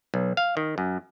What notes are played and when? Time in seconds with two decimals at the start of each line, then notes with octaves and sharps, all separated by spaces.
0.14 B1
0.37 F5
0.57 D#3
0.78 F#2